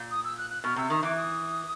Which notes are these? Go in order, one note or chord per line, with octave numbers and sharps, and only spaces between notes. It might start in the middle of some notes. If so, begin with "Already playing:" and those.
Already playing: A#2
D#6
E6
F#6
F#6
B2 F6
C3 E6
D#3 D#6
E3 D6
D#6